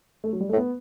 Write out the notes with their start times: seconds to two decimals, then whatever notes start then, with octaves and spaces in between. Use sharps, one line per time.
0.24 A3
0.33 F#3
0.41 G3
0.49 A3
0.53 A2
0.57 B3